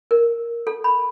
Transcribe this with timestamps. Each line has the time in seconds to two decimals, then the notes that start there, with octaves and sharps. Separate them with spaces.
0.11 A#4
0.67 A4
0.84 B5